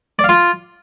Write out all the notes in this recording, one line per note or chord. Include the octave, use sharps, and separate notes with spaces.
D5
F5
F4